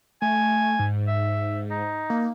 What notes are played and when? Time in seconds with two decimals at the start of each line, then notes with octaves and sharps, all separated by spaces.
0.22 A3 G#5
0.79 G#2
1.07 E5
1.70 D#4
2.10 A#3